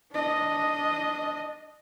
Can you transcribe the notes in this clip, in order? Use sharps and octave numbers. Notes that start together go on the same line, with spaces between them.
D4 D#5